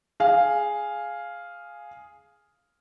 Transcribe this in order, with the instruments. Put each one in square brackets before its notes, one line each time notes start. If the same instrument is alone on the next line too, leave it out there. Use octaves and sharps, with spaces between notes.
[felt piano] G#4 F5